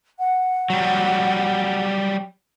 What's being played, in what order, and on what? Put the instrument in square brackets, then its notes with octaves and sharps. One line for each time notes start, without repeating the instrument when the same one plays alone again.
[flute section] F#5
[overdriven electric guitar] F#3 G3